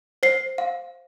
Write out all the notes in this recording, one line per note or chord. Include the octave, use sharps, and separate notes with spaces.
C5 C7
F5